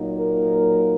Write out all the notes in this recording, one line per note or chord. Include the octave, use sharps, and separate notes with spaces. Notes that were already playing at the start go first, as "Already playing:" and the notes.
Already playing: A#2 F#3 A#3 D#4
A#4